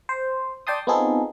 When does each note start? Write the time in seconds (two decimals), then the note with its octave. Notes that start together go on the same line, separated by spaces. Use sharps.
0.09 C5
0.67 D5 G5 A5 C6 D#6
0.87 B3 C4 D#4 F4 G#4 A4